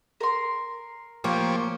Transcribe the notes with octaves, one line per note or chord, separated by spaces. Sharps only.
A#4 C6
F3 A#3 G4 C#5